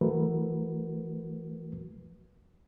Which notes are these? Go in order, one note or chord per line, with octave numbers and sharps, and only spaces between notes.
E3 F#3 A3 F#4 A#4 B4